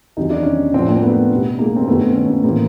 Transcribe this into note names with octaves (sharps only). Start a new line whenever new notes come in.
E2 C3 D#3 F#3 D#4
D4
C#4 D#4
A2 F3 C4 D4
A#3 C4
A3 B3
B2 G3
G#3 A#3
C4
G2 D#3 G3 A3 B3
C4
C#4
A#3 C4
A2 E3 G3 A#3 C4